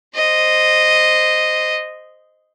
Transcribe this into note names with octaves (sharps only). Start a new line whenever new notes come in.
C5 D#5